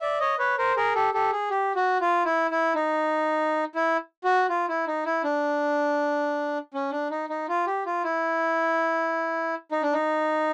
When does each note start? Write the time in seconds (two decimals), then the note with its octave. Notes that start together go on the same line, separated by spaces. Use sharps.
0.01 D5 E5
0.20 C#5 D#5
0.38 B4 C#5
0.58 A#4 C5
0.76 G#4 A#4
0.95 G4 A4
1.14 G4 A4
1.32 G#4
1.50 G4
1.76 F#4
2.01 F4
2.25 E4
2.51 E4
2.75 D#4
3.75 E4
4.24 F#4
4.49 F4
4.68 E4
4.87 D#4
5.05 E4
5.24 D4
6.74 C#4
6.91 D4
7.11 D#4
7.29 D#4
7.49 F4
7.67 G4
7.86 F4
8.04 E4
9.72 D#4
9.83 D4
9.93 D#4